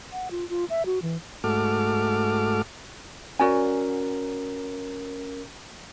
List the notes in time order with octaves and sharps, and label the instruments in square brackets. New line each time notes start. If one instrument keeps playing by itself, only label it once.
[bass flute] F#5
F4
F4
E5
F#4
E3
[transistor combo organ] G#2 A3 F#4 A4 D6 F6
[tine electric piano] C#4 A#4 [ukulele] F#4 D5 G#5